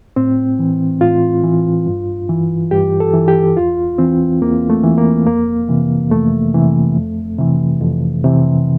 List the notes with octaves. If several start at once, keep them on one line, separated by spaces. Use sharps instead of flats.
A2 C4
E3
A2 F4
E3
G2
E3
G2 G4
A4
E3
G4
E2 F4
E3 C4
E2 A#3
A3
E3
A#3
F2 A#3
C3 E3
F2 A3
C3 E3
F2
C3 E3
F2
C3 E3